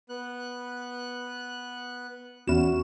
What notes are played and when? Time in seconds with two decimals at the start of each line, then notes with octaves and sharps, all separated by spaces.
0.09 B3 F#6
2.47 E2 C#4 F#4 E7